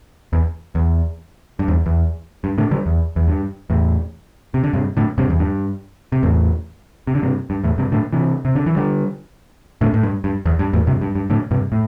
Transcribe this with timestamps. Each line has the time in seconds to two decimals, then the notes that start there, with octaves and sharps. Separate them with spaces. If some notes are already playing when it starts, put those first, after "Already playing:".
0.33 E2
0.75 E2
1.59 G2
1.68 E2
1.86 E2
2.44 G2
2.58 A2 D3
2.71 D3 G3
2.86 E2
3.16 E2
3.28 G2
3.70 E2 A2
4.54 C3
4.64 D3
4.73 G2 C3
4.97 A2 D3
5.18 G2 C3
5.30 E2
5.39 G2
6.12 C3
6.23 E2 A2
7.07 C3
7.15 D3
7.22 G2 C3
7.50 G2
7.64 E2 A2
7.78 G2 C3
7.92 A2 D3
8.13 C3 E3
8.45 C3
8.55 D3
8.66 E3
8.76 D3 G3
9.81 A2 D3
9.94 A2
10.03 G2
10.24 G2
10.46 E2
10.59 G2
10.73 E2 A2
10.87 G2 C3
11.01 G2
11.15 G2
11.30 A2 D3
11.51 G2 C3
11.72 A2